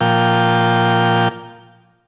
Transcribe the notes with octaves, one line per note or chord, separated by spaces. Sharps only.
A#2 F3 G5